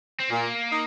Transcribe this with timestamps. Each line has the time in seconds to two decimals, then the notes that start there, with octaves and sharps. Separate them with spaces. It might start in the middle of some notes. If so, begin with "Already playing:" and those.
0.20 C4
0.30 A#2 A#3
0.71 D#4